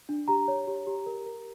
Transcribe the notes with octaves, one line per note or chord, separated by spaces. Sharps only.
D4
G4 A#5
C#5
G4
G4
A#4
A#4